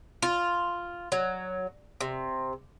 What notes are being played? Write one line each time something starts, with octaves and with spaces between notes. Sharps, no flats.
F4
F#3
C3